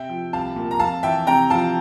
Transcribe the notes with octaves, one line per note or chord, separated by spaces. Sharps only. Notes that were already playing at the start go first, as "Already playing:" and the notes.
Already playing: C3 E5 G5
F3
C2 F5 A5
A#2
A#5
F2 F5 A5
E3 E5 G5
C3 G5 A#5
F3 F5 A5